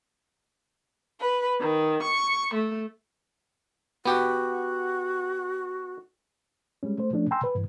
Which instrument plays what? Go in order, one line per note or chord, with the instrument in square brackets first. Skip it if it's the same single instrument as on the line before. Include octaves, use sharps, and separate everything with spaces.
[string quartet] B4
D#3
C#6
A3
[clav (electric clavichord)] B3 G4 [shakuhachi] F#4
[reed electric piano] G3 G#3 C#4
A3 C5
F3 A3 C#4 D4
G5 G#5 A#5 C6 E6
B4
G2 E3